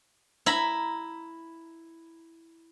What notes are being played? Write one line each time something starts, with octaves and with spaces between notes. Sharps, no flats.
E4 A#5 B5